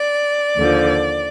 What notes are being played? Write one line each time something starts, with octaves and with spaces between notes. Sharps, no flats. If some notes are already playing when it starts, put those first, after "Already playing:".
Already playing: D5
D#2 D3 F3